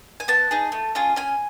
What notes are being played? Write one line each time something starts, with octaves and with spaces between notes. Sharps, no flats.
G#5
B3 A5
D#4 G#4
A3
C#4 F4 G#4
C#4 G#5